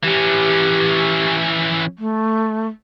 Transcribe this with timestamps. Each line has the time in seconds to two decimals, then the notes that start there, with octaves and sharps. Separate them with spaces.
0.04 E3 C#4 G4
1.99 A3